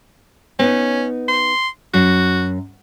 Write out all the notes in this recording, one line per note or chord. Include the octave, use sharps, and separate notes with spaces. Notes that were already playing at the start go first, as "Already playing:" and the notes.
B3 C#4 D#4
C6
F#2 F#4